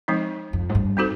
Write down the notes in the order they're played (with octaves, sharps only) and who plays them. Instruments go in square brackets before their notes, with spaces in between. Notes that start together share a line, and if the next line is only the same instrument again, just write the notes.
[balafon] F3 G#3 C4 D#4
[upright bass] F2
G#2
G2
[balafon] C4 D#4 F#4 A4 C5